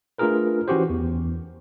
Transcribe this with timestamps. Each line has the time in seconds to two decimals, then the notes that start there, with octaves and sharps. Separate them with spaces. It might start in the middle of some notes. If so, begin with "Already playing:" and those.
0.18 A3 D4 F4 G#4 A#4 B4
0.68 E3 C#4 F#4 G4 C5
0.90 E2